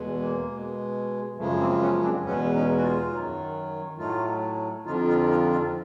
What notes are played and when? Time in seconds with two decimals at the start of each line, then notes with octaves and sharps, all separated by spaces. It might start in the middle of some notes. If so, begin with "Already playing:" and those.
Already playing: E2 B2 G#3
0.21 A#3
0.50 B2 G#3
1.37 F#2 C#3 F3 G#3 A3
1.59 A#3 C4
1.81 B3 C#4
2.02 C4 D4
2.24 E2 B2 G#3 B3 C#4
2.53 C#4 D#4
2.78 F#4
2.82 D#4 F4
3.11 F#2 D#3 F#3
3.98 A2 F#3 A3 D#4 F4
4.85 F2 D3 F3 D#4 F4
5.07 D#4 F4
5.29 D#4 F4
5.51 D#4 F4